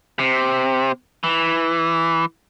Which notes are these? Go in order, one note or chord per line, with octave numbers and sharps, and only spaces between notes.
C3
E3